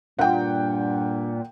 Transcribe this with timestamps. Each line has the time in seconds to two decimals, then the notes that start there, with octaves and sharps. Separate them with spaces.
0.19 G2 A#2 F#5 G5